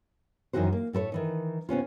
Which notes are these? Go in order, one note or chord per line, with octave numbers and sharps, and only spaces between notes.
F#2 D#3 E3 D#4 F#4 C5
A#3
A2 A3 B4 C#5
D#3 E3 D#4
C3 B3 C#4 F4